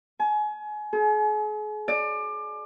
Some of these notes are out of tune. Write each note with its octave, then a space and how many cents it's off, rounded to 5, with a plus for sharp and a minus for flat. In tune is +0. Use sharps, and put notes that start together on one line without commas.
G#5 +30
G#4 +40
D5 +25